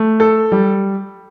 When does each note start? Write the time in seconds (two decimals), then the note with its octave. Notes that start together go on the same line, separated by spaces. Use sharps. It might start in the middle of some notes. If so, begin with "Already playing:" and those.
Already playing: A3
0.20 A4
0.52 G3